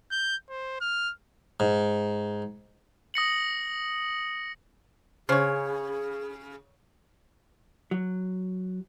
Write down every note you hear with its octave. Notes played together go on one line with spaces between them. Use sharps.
G6
C5
F6
G#2
D#6 A#6 C#7 F#7
C#3 G#4 C5 C#5
F#3